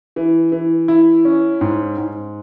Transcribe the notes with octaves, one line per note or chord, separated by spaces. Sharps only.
E3
E3
E4
C#4
G#2
G#2